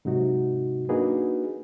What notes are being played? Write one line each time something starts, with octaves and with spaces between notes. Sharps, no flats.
G#2 C3 F#3 D#4 F#4
A#3 D4 D#4 F#4 G#4 B4